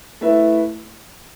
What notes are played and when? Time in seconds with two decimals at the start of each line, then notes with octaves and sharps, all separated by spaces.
0.21 A3 E4 B4 E5